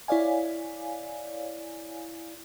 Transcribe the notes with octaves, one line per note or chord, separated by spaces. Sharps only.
E4 C#5 D5 F5 G#5